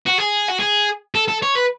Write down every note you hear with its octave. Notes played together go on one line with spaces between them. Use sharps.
F#4
G#4
F#4
G#4
A4
A4
C#5
B4